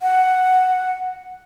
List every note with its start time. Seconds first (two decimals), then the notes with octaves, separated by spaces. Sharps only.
0.01 F#5